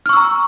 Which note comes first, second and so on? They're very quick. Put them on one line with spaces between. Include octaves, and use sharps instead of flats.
F6 C#6 E6 A#5